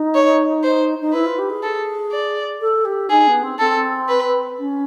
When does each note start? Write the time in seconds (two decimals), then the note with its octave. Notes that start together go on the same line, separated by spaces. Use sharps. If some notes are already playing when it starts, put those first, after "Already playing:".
Already playing: D#4
0.15 C#5
0.64 C5
1.01 D#4
1.13 E4 B4
1.26 F4
1.38 G4
1.50 G#4
1.63 A4
2.12 D5
2.61 A4
2.85 G4
3.10 D#4 G#4
3.28 B3
3.43 C4
3.59 C4 A4
4.09 B4
4.59 C#4